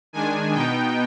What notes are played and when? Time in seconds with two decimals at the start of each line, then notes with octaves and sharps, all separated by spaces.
0.13 D#3 G#3 D4 G#5
0.54 B2 B3 D#4 G5